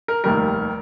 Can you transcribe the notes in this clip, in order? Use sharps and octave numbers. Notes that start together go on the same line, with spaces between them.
A#4
F1 D#2 D#3 G3 A#4